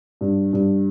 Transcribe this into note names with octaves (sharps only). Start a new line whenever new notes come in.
G2
G2